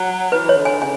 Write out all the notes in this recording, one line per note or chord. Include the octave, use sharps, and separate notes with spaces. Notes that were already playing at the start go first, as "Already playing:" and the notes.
Already playing: F#3
E3 B4
C#5
D3
G#5
C#3 G#5